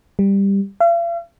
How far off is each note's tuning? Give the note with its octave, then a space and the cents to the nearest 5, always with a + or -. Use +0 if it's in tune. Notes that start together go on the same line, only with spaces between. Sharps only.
G3 +10
F5 -45